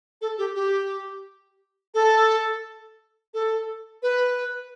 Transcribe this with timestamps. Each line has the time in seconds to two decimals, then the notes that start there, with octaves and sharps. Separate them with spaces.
0.22 A4
0.38 G4
0.55 G4
1.94 A4
3.34 A4
4.03 B4